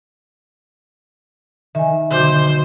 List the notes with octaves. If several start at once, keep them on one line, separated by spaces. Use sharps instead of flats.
D#3 E5 G#5
B1 D3 F#4 C5 D6 G6